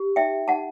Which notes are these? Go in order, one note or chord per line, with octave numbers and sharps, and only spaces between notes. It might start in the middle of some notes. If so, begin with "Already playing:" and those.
Already playing: G4
D#4 E5 G5
D#4 F#5 A5